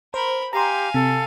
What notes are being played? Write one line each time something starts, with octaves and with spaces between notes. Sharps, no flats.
A#4 C5 B5
G4 F5 G#5 A#5 C6
C3 A4